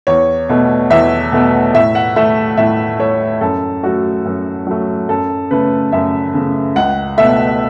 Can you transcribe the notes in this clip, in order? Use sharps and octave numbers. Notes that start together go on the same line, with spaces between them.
E2 C#5
B2 A3
E2 E5
B2 A3
A2 E5
F#5
A3 E5
A2 E5
A3 C#5
F#2 A4
F#3 A3 F#4
F#2
F#3 A3
F#2 A4
C#3 A3 B4
F#2 E5
C#3 A3
C#2 F#5
B2 A3 E5